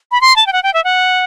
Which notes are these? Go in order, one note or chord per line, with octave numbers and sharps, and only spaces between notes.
B5
C6
A5
G5
F#5
G5
E5
F#5